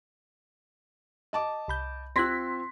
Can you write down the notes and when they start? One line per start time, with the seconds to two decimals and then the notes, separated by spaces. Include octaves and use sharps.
1.33 D#5 A5 D6
1.68 C2 B5 G6
2.16 C4 F4 C6 E6 F#6 G#6 A#6 B6